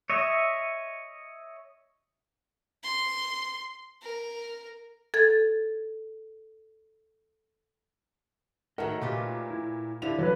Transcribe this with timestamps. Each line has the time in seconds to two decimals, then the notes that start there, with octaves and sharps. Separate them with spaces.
0.10 C#5 D#5 E5
2.83 C6
4.02 A#4
5.14 A4 G#6 A6
8.78 D#3 A3 F#4 A#4 C#5 D#5 F#5
9.01 A#2 F4 G4 B4
9.51 E4
10.02 D3 F3 E4 G4 F7
10.18 E3 F#3 A4 B4 C#5